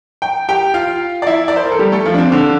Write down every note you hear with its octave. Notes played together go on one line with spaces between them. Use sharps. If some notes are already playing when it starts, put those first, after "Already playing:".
G5
G4 G5
F4 F5
D5
E4 E5
D5
C5
A#4
A4
G3 G4
A3 A4
F3 F4
D4
C4
D3 D4